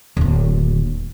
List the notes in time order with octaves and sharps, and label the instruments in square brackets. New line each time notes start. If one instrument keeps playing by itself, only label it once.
[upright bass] D1 D#2